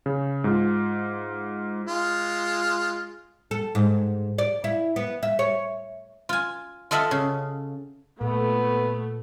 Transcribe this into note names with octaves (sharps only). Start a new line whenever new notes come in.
C#3
G#2 F4
G#3 F4
A4
G#2
D5
E4
B3
E5
C#5
F4 G#5
F4 A4 D#5 E5 F#5
C#3
A#2 A3 B3